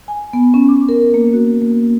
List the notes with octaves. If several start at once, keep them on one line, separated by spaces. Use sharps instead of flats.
G#5
B3
C#4
D6
A#4
A#3
F#4
A#3